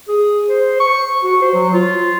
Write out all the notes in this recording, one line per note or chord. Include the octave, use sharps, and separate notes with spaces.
G#4
C5
C#6
F#4
C5
F#3
F4